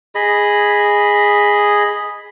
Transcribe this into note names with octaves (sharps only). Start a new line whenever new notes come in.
G#4 D#5 B5